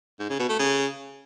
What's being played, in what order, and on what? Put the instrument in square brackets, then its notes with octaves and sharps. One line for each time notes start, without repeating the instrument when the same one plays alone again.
[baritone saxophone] G#2
C#3
B2
A3
C#3